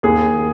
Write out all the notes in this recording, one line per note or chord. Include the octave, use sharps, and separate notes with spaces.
D#2 G#4